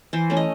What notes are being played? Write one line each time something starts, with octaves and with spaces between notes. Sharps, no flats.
E3 C5
A3 C#4
D#5